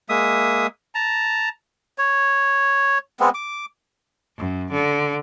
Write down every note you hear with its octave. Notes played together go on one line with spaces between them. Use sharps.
G#3 A#3 E5 D#6
A5 A#5
C#5
G#3 B3 C4
D6
F#2
D3